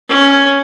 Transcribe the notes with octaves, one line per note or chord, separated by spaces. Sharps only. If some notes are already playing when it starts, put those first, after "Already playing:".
C#4